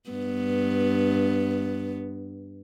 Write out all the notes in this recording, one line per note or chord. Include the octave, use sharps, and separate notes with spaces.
G2 B3